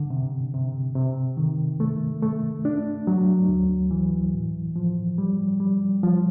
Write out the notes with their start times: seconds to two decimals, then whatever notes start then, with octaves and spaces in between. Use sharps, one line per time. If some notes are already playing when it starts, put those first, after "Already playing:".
Already playing: D3
0.10 C3
0.54 C3
0.95 C3
1.37 D#3
1.80 A3
2.22 A3
2.65 D4
3.07 F#3
3.48 D2
3.91 E3
4.34 A2
4.76 F3
5.18 G3
5.60 G3
6.03 F3